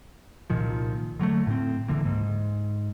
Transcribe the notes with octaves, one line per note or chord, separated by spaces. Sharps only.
C2 A#2 D#3 F3
D3 F#3 G#3 A3
A2 C4
C#2 D3 E3 A#3
G#2